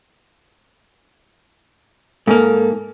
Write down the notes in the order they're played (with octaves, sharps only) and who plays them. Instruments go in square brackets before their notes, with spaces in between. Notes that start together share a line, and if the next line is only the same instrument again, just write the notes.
[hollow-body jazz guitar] G#2 A#3 [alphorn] A4